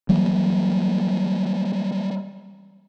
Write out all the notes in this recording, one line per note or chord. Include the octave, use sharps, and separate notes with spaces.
E3 F#3 G3 A#3